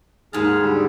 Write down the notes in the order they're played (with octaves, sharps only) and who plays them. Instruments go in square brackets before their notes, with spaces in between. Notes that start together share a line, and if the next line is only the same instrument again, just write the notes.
[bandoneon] D#2 G#4 F6 [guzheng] G#2 A5
[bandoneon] D3 G3